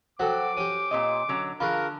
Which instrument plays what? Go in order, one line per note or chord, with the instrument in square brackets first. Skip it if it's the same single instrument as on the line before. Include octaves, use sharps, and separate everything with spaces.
[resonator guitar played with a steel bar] F#3 [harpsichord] F#4 A4 [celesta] C5 G5 [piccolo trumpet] D6
[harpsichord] C#4 G4 [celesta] D#7
[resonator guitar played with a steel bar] A#2 C4 D#5
D3 F#3 C#4
[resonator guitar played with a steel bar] D3 [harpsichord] F4 G#4 [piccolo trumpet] A#4 [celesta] B5 C#6 F#6